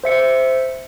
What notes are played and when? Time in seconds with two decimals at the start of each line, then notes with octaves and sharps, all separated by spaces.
0.04 C5 E5 C#7